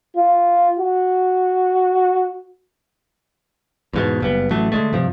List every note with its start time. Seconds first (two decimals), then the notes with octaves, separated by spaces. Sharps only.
0.16 F4
0.79 F#4
3.93 E2 G#2 B2
4.20 F#1 G2 B3
4.51 A1 F#3 A3
4.72 D3 G#3 A3
4.93 G2 C3 F3